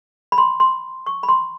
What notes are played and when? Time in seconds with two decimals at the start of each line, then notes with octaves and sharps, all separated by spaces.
0.32 B5
0.38 C6
0.60 C6
1.06 C#6
1.23 B5
1.29 C6